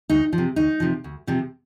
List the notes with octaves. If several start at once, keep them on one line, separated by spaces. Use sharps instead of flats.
D2 D#4
F3
C3
D2 D#4
C3 F3
D2
C3 F3